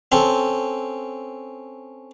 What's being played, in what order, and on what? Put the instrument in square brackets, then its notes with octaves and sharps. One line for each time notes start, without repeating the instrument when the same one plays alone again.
[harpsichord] C4 C#4 A4